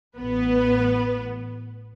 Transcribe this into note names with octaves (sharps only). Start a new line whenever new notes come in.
A1 B3 B4